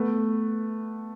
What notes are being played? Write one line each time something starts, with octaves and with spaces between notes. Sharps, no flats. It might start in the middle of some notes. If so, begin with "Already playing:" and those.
Already playing: A3 B3